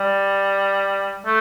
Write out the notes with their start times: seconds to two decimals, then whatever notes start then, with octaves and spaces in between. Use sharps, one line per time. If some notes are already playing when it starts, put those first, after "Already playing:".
Already playing: G3
1.26 A3